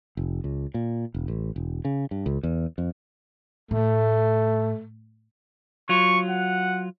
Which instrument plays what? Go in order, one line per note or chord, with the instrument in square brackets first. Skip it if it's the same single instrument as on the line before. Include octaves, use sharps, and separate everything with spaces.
[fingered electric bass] F1
C#2
A#2
E1
A1
E1
C#3
G2
C#2
E2
F2
[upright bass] A2 [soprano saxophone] A3
[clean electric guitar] F#3 F4 [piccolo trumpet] C#6
[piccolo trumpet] F#5